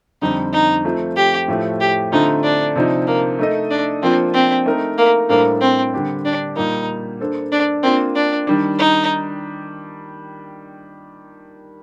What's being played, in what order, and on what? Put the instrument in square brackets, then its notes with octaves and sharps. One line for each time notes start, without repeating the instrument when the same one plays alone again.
[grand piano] F2 D3 G3 C4 [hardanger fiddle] D#4
[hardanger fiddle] D#4
[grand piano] F3 A3 C4 F4
[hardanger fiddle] G4
[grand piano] A2 F3 A3
[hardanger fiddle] G4
[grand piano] D3 A3 C4 F4 [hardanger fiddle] D#4
[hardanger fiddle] D4
[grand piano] C3 F3 C4 D#4
[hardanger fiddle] A#3
[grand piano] A3 D#4 A4 D#5
[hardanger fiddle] D4
[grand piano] F3 A#3 D4 F4 [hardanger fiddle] C4
[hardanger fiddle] C4
[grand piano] A3 D#4 A#4
[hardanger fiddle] A#3
[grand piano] A2 G3 D4 A4 C5 [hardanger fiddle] A#3
[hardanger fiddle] C4
[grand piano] D3 G3 D4 G4 C5
[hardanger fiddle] D4
[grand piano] A#2 G3 A#3 [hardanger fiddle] D#4
[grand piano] A#3 D4 A4 C5
[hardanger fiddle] D4
[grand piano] A#3 D4 F4 [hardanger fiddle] C4
[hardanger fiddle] D4
[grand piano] D#3 G3 D4
[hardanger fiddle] D#4